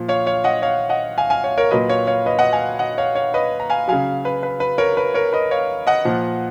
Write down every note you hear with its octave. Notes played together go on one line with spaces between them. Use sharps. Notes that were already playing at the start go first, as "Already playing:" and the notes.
Already playing: A#2 F3
C#5 F5
C#5 F5
D#5 F#5
C#5 F5
D#5 F#5
F5 G#5
F5 G#5
C#5 F5
A#4 C#5
A#2 F#3 B4 D#5
C#5 F5
C#5 F5
B4 D#5
D#5 F#5
F5 G#5
D#5 F#5
C#5 F5
C#5 F5
B4 D#5
A#5
F5 G#5
C#3 F#3 F5 G#5
B4
B4
B4
A#4 C#5
B4
A#4 C#5
B4 D#5
C#5 F5
D#5 F#5
A#2 F3